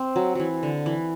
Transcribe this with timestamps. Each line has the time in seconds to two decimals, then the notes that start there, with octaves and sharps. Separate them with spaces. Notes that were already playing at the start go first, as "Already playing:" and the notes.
Already playing: C4
0.16 F#3
0.35 E3 F#3
0.63 D3
0.86 E3